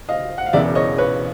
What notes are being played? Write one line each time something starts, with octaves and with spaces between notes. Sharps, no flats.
D#5 F5
F#5
F5
E1 E2 C#3 E3 D5 E5
C#5 D#5
B4 C#5